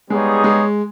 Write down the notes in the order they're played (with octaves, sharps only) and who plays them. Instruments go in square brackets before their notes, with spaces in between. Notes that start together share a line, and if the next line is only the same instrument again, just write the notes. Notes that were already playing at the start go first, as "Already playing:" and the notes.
[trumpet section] G3 B3 D#4 G#4 C#5 [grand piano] G#3
[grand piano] G#3